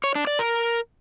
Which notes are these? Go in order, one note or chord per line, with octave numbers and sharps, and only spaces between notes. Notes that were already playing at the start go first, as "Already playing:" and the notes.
C#5
D4
D5
A#4